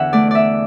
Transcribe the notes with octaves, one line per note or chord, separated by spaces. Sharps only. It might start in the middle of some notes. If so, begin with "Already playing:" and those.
Already playing: E2 D3 E5 F#5
A3 D5
D5 E5